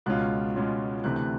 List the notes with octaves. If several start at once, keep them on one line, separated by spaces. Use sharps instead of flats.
C#2 B2 G#3 C#4 F4 F#6
C#2 B2 G#3 C#4 F4
D2 C3 E3 A3 C4 F#6
F#6